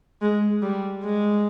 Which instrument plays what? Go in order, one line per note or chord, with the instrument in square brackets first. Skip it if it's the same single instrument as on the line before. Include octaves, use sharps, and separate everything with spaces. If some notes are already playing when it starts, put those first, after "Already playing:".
[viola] G#3
G3
G#3